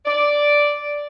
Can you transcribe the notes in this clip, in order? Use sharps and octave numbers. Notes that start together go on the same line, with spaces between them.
D5